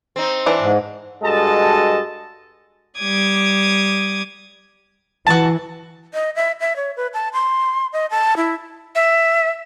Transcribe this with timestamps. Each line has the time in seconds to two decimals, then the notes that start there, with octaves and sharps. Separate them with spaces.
0.16 C4 D#4
0.46 E3 D4
0.61 G#2
1.23 G2 G#3 F#4 A4 D#5 A5
2.99 G3 D6 D#6 G#6
5.27 E3 F#4 A5
6.14 D#5
6.36 E5
6.60 E5
6.76 C#5
6.97 B4
7.14 A5
7.33 C6
7.93 D#5
8.11 A5
8.37 E4
8.95 E5